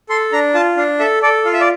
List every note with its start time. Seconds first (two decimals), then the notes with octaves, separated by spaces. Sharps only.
0.09 A4 C6
0.32 D4 A#5
0.54 F4 A5
0.77 D4 F5
0.99 A4 E5
1.22 A4 D5
1.45 F4 F5
1.54 E5
1.61 D5